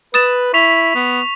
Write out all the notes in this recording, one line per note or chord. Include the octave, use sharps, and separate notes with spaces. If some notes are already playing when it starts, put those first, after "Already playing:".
B4 D#6 A6 E7
E4 C#6 B6 F7
B3